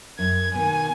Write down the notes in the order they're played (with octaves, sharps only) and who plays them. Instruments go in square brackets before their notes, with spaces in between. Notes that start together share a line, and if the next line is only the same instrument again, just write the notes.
[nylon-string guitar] F#2 [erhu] G#6
[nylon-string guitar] B2 D#3 [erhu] G#5